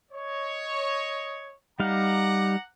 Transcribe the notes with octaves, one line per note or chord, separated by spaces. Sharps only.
C#5 D#5
G3 D#4 F5 F#5 A#5 D6